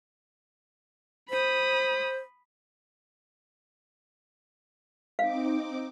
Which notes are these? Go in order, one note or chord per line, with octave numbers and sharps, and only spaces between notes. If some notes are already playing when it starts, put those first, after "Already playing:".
C5 B5 D#6
C4 D#4 F5 D6